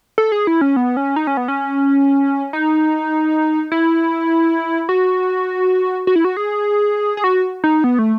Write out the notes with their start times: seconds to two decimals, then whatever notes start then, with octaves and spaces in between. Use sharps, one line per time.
0.18 A4
0.32 G#4
0.47 E4
0.61 C#4
0.76 B3
0.97 C#4
1.16 D#4
1.27 C#4
1.37 B3
1.48 C#4
2.53 D#4
3.72 E4
4.89 F#4
6.07 F#4
6.16 E4
6.25 F#4
6.37 G#4
7.17 G#4
7.24 F#4
7.64 D#4
7.84 B3
7.99 A3